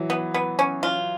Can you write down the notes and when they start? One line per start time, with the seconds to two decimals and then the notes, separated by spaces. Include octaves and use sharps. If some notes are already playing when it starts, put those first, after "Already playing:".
Already playing: E3 F#3
0.10 B3
0.34 B3
0.59 C#4
0.83 F4